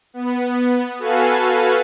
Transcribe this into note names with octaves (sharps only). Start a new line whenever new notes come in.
B3
F#4 A4 B4 F5 G#5